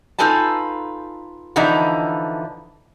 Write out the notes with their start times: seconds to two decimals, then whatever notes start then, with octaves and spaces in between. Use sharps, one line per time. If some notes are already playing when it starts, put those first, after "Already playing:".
0.19 D#4 F4 A4 B4 G#5 A5
1.56 D3 E3 F3 D#4 E4